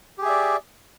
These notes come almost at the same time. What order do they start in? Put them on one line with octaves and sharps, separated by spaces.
G4 G#4 E5 D5